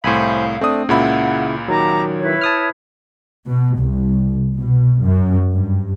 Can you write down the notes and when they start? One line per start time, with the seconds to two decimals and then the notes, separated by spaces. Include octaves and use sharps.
0.04 C2 A2 C5 F5 G#5 B5
0.61 A3 C4 D4 D#6
0.89 C#2 A#2 C#3 E4 F#5 B5
1.68 D#3 F#3 G4 A5 A#5
2.20 E4 B4 C#5
2.41 A5 D#6 F6
3.48 B2
3.80 C2
4.58 B2
5.04 F#2
5.53 G2